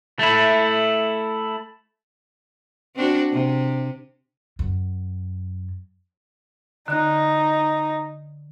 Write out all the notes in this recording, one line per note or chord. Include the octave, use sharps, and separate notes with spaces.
A3 E4
C4 D4 F#4
C3
F#2
D3 D#4 F#6